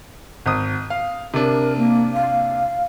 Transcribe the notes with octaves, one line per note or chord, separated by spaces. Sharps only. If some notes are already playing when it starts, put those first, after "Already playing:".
G#1 D#6
F5
C3 D4 A#4
A#3
F5